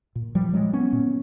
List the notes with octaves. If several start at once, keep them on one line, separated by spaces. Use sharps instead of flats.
A#2
F3 G3
F#3 G#3
B3 C#4
A#2